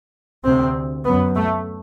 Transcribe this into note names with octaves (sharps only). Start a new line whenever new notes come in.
D2 C3 C4
F#2 B3
A3